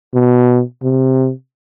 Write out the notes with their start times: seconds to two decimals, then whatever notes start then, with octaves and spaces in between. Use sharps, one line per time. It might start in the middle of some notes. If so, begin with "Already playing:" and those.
0.14 B2
0.83 C3